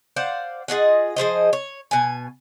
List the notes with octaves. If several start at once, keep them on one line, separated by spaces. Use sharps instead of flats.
C5 D5 F5 F#5
F4 G#4 D#5 F#5
F3 G#4 C5 D#5
C#5
B2 G#5